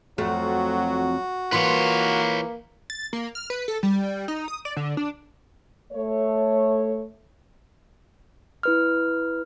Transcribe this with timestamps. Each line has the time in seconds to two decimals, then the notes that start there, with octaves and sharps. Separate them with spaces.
0.18 F2 F#3 A3 F#4
1.52 E3 A#3 F4 B4 C#5
2.90 A6
3.13 A#3
3.35 F6
3.50 B4
3.68 A4
3.83 G3
4.28 D#4
4.48 D#6
4.65 D5
4.77 D3
4.97 D4
5.93 A3 C#5
8.63 E4 B4 F6